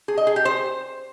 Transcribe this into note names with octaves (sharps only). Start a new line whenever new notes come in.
G#4
D#5
G#4
G4
C5